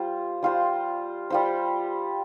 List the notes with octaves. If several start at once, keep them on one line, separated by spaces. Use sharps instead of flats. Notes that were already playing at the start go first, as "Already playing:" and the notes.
Already playing: G3 F4 C5
G3 F4 C5
G3 F4 C5